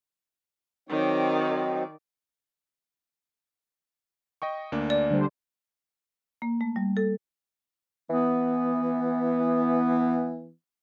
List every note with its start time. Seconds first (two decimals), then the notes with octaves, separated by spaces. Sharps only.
0.89 D#3 F#3 C4 D#4 D5
4.42 D#5 G5 C#6
4.72 D2 A#3 D4
4.90 D5
5.10 D3 G3 C5
6.42 A#3
6.61 A3
6.76 G3
6.97 A4
8.10 E3 B3